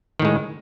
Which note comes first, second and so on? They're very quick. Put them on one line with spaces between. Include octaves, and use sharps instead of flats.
D#3 A2 G#3